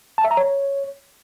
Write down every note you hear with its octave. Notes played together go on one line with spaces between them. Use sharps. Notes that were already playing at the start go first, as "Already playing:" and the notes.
A5
E5
A#5
C#5